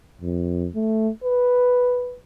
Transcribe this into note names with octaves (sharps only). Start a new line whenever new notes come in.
F2
A3
B4